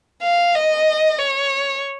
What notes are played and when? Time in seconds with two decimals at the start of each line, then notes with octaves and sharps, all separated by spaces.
0.23 F5
0.55 D#5
1.19 C#5